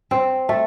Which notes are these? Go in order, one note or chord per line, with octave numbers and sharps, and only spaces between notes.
C4
A3